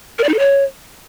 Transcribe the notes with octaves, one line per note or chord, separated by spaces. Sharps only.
A#4
D5
D#4
A4
C#5